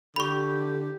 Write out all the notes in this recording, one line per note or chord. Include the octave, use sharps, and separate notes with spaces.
D3 G4 B5 C#6